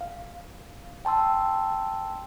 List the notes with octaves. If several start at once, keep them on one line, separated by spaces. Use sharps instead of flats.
F5
G5 A5 C6 E6